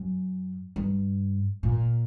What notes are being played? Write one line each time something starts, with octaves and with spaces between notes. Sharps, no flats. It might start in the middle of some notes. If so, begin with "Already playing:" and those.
Already playing: F#2
G2
A#2